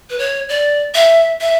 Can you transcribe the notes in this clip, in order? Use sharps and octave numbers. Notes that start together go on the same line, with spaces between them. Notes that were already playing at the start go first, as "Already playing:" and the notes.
B4
C#5
D5
E5
E5